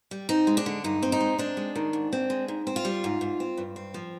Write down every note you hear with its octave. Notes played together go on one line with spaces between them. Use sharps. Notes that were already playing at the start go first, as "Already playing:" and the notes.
G3
C4 D#4
G#3
D4
D3
G2 D#4
C4
D#4
G#3
C4 D4
G#3
D#3
G#2
C4
G#3
G#2
C4
F4
G3
G#2
G#2
C4
G2
C4
F3